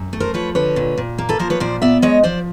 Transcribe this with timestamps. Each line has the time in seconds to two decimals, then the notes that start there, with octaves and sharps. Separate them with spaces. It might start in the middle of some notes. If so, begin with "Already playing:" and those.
Already playing: F#2
0.13 A3
0.20 A#4 C5
0.34 F3 B4 C#5
0.55 D3 B4 C#5
0.76 A#2
0.98 A#2
1.18 A#3
1.29 A4 B4
1.39 F3 A#4 C5
1.50 B4 C#5
1.60 A#2 C5 D5
1.82 B3 D5 E5
2.02 G#3 C#5 D#5
2.23 F3 C5 D5